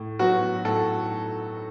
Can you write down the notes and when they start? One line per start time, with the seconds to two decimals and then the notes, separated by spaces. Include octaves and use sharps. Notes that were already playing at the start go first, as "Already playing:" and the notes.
Already playing: A2
0.19 F#3 B3 F#4
0.65 A2 A4